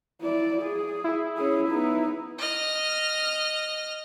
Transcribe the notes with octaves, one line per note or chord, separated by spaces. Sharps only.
E4 D5
G#4
E4
C#4 G#4
B3 D#4
D#5 F6